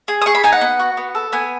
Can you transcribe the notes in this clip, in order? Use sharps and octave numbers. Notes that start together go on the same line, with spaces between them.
G#4
D#6
G#4 C#6
B5
D#4 G#5
F#5
B3
F#4
B3
A4
B3 G#5